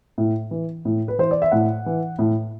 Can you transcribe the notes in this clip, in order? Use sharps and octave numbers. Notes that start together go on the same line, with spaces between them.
A2
E3
A2
B4
E3 C5
D5
E5
A2 F#5
E3
A2